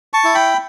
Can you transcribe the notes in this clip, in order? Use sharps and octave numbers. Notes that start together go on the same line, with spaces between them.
A5 C#6
E4
G5 B5